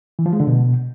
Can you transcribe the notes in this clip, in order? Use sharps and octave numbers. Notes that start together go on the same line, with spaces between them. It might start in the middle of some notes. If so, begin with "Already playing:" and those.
E3
F3
G#3
D3
B2